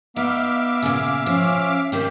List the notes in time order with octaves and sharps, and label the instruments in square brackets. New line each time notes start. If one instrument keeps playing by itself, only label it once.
[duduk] B3 [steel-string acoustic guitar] D#4 [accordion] E5 F5 D6
[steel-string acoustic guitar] A#2 C#3
[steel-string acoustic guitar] F3 [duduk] C#4
[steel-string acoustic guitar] D#3 C4 [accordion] G4